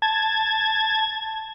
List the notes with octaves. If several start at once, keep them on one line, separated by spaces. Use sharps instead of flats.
A5 G#6